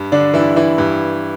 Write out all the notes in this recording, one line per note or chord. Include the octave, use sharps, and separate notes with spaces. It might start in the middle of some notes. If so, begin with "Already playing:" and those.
Already playing: G2
D3 D4
G2 E3 E4
E3 E4
G2